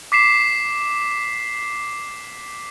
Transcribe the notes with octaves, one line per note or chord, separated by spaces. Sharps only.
D6 B6 C7 E7